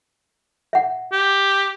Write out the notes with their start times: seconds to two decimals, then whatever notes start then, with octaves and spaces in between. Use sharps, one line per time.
0.73 E5 F#5
1.12 G4